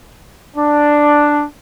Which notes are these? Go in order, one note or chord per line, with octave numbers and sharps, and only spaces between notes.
D4